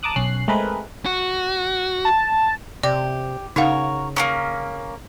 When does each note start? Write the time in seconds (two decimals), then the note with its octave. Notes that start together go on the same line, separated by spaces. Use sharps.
0.03 A5 A#5 D6 D#6 F#6
0.16 B1 C#4 F#6 C7
0.48 G#3 A3 C4 G#4 A#4 B4
1.06 F#4
2.05 A5
2.83 C3 G4 D5
3.56 C#3 D#4 F#4 A#4 C#5 F5
4.16 A#3 B3 C#4 A#5 D#6